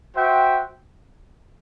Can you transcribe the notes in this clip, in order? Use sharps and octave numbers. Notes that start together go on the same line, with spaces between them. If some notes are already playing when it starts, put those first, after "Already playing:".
F#4 C5 E5 G5